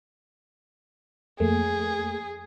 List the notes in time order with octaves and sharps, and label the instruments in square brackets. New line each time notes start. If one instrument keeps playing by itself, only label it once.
[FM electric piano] F2 A3 A#3 [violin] G#4